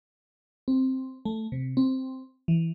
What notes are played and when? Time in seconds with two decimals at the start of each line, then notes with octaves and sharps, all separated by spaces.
0.68 C4
1.25 A3
1.52 C3
1.77 C4
2.48 E3